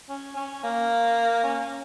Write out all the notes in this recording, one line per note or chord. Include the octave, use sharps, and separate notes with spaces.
C#4
C#4
A#3
C#4
C#4